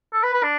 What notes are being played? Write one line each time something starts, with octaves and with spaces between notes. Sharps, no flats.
A4
B4
B4
D4